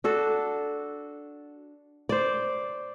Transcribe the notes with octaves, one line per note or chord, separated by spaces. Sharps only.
D4 F#4 A4
C5 D5